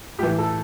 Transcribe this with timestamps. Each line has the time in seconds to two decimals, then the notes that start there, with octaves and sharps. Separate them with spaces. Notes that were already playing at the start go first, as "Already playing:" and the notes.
0.19 A2 G4
0.23 E3
0.38 A4